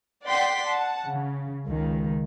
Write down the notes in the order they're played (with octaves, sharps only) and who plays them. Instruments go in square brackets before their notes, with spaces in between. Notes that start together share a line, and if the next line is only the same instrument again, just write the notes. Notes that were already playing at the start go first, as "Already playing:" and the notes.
[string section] D5 F#5 G5 C6 B6
F#5 A5
C#3
C#2 D#3